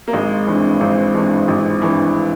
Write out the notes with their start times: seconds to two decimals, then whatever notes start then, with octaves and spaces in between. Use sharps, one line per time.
0.08 A#3
0.13 G#1 G#3
0.46 G2 E3 C4
0.81 G#1 C4
1.14 G2 E3 G#3
1.48 G#1
1.80 G2 E3